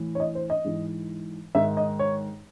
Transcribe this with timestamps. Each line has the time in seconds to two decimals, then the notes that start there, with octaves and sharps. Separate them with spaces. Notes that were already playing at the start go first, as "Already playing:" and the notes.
Already playing: A2 E3
0.15 C#5
0.20 D#5
0.35 C5
0.50 D#5
0.64 G#2 E3
1.55 G#2 D#3 E5
1.77 D#5
1.99 C#5